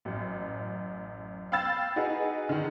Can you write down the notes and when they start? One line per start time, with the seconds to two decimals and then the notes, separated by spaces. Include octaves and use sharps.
0.05 A1 F#2
1.52 F5 G5 B5 E6 A6 E7
1.96 D#4 F#4 G#4 B4
2.49 D3 D#3